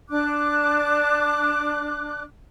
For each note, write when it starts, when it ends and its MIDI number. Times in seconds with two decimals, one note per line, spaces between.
0.10 2.22 62
0.10 2.22 86
0.10 2.22 90